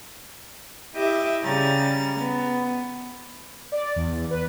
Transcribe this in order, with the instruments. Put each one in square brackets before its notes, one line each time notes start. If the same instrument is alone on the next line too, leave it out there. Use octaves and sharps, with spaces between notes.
[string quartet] E4 G4 D#5 E5 D6
C#3 G3 A#5 A6
B3
[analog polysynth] D5
E2
B4